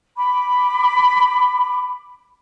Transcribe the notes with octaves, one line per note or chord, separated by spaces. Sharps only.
B5 D6